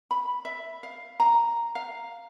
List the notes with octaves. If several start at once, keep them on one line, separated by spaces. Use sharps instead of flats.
B5
E5
F5
A#5
F5